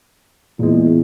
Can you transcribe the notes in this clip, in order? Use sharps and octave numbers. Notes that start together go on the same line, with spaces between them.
E2 A#2 G#3